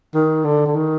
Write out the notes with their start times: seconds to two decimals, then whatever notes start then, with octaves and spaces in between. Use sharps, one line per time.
0.15 D#3
0.45 D3
0.67 D3
0.76 D#3